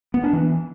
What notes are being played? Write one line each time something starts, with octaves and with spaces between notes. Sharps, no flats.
B3
D4
E3